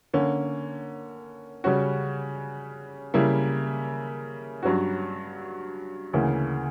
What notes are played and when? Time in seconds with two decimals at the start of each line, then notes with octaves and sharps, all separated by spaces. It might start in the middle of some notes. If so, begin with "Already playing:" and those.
0.14 D3 A#3 C#4
1.64 C#3 G3 C#4 F#4
3.14 C#3 G3 A#3 E4
4.63 G2 F#3 C#4 F#4
6.13 D2 C#3 E3 A#3